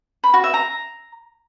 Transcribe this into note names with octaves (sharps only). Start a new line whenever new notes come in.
B5
F#4
E5
A#5